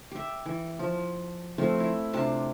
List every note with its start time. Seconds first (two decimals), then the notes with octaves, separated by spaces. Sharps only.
0.11 G4 E5
0.46 E3
0.79 F3
1.58 F3 A3 C4 F4
1.80 E4
2.13 C3 D4 F4 A5